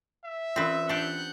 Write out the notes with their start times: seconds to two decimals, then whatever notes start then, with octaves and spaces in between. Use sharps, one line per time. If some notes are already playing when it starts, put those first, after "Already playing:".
0.24 E5
0.56 E3 C4 C#4 F4 B4
0.89 D4 G4 F#5 F#6 G6